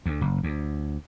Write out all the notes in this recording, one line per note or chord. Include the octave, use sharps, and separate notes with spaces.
D2
F#1
D2